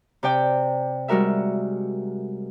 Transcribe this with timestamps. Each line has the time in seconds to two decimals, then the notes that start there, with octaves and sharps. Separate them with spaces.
0.23 C3 D5 G5 D6
1.08 G3 G#3 F#4 A#4 E5